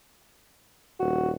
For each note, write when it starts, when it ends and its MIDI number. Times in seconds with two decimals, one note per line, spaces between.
1.00 1.36 27
1.00 1.31 66